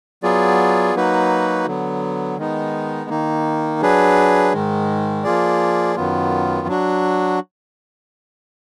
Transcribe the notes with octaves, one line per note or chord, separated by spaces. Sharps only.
F#3 B3 F4 G#4 D5
F#3 A#3 D#4 F#4 B4
D3 F#3 B3
D#3 G#3 B3 D#4
D#3 A#3 D#4
F#3 D4 G#4 B4
G#2 D#3 G#3
F3 A#3 F4 G#4 D5
F#2 D#3 F#3 B3 F4
F#3 D4 F#4